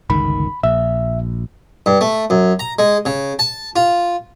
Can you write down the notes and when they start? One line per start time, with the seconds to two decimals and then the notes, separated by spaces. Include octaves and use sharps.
0.10 G1 C#2 D#3 B5
0.63 A#1 E5
1.86 G2
2.01 A3
2.30 F#2
2.59 A#5
2.79 G#3
3.06 C#3
3.39 A5
3.76 F4